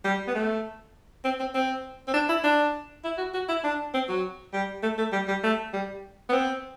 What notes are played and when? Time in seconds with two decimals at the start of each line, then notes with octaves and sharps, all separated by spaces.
0.04 G3
0.28 B3
0.35 A3
1.24 C4
1.39 C4
1.54 C4
2.07 C4
2.13 D4
2.29 E4
2.44 D4
3.04 E4
3.18 F#4
3.34 F#4
3.48 E4
3.64 D4
3.94 C4
4.09 F#3
4.53 G3
4.83 A3
4.98 A3
5.12 G3
5.28 G3
5.43 A3
5.73 G3
6.29 B3
6.32 C4